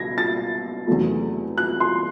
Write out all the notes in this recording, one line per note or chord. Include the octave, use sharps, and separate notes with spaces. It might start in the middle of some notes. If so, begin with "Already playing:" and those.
Already playing: C#2 B2 G#6 A#6
A6
E2 C3 D#3 F#3 A3
F#6
C6